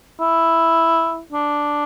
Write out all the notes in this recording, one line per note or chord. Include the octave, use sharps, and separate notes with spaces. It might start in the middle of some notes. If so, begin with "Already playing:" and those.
E4
D4